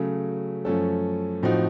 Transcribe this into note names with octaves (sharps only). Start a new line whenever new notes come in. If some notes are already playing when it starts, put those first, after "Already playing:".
Already playing: C#3 F#3 A3
F#2 F3 A3 C#4 A4
A2 F3 C4 D#4 F#4